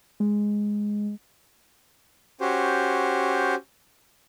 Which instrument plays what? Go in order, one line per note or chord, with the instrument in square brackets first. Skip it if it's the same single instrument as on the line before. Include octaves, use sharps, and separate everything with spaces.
[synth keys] G#3
[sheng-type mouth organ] C#4 F#4 G4 C5